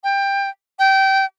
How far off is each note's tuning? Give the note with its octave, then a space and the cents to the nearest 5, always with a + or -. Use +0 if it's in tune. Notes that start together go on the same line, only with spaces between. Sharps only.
G5 +20
G5 -20